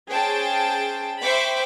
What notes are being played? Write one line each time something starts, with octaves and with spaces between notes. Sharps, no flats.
C#4 G#4 C5 G5 A5
C5 E5 G5 B5 C#6 D6